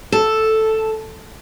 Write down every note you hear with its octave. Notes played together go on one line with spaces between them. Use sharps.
A4